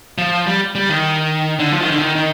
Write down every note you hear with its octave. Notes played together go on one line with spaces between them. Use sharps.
F3
G3
G3
D#3
D3
F3
D#3
D3
D#3
D#3